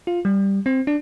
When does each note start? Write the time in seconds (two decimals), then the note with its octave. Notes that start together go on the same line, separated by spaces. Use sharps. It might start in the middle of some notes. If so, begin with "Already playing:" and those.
0.07 F4
0.25 G3
0.66 C4
0.87 D4